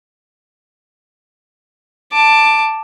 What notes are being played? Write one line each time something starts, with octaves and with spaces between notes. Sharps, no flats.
A5 D6